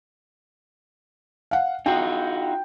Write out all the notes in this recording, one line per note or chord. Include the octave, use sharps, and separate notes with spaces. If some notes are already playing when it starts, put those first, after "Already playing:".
F5 F#5
D#4 F4 F#4 G5